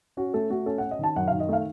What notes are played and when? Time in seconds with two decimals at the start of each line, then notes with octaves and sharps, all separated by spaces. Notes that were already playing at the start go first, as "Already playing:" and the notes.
0.17 C#4 F#4
0.34 A3 A4
0.50 A3 F#4
0.66 C#4 A4
0.78 C#4 F#5
0.91 D#5
0.99 D#3 A5
1.16 F#2 F#5
1.28 D#3 F5
1.40 D#5
1.49 A3 F5